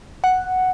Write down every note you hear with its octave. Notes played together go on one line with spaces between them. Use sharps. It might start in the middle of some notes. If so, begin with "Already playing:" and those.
F#5